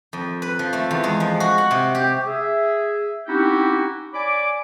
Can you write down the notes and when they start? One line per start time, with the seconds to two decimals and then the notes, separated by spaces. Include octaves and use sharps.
0.13 F2
0.42 B4
0.59 F3
0.73 A3
0.91 E2
1.04 G#3
1.20 F3
1.40 F#4
1.58 F#5
1.71 C3
1.95 G4
2.26 G#4 E5
3.27 C4 C#4 D#4 E4 F#4 G4
4.14 C#5 D5 G#5 B5 D6